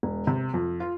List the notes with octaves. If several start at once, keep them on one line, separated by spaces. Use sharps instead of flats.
E1
C3
F2
F4